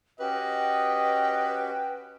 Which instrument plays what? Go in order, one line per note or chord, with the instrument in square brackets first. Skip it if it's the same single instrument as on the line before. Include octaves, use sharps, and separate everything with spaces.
[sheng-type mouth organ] C#4 F#4 G4 [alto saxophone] B4 [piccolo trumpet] D#5 [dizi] G5